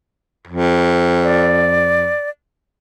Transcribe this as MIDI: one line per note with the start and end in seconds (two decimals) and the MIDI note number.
0.47 2.14 41
1.23 2.30 74